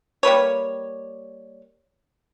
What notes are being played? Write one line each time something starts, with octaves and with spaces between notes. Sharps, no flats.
G3 A#3 B4 C#5